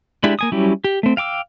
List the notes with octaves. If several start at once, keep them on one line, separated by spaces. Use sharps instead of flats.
G#3 D4 E4 G4
A#3 G#5 D#6
F#3 G3 C#4 E4 G4
G4
A3 C4
F5 G5 D6 E6